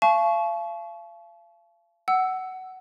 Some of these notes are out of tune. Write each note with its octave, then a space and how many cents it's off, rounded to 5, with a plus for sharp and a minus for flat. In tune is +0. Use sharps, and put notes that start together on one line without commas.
F5 -35 A5 -40 C#6 +0
F#5 +15 E6 +0